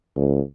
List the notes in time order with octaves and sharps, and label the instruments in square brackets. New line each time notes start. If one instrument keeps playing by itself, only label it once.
[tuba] C#2